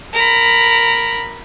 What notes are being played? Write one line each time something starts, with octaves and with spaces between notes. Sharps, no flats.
A#4 B5